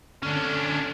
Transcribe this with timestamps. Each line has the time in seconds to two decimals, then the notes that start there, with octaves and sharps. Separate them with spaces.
0.23 D3 C#4 D4